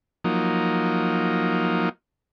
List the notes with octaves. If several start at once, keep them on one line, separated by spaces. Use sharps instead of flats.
F3 F#3 A#3 D#4